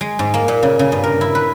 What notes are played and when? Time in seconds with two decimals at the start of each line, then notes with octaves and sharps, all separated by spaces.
0.01 G#3
0.19 G#2
0.34 A#3
0.48 A#2
0.63 C#3
0.79 C#3
0.92 G2
1.04 A#4
1.21 E4
1.35 B4